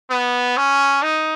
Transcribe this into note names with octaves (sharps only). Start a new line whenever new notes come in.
B3
C#4
D#4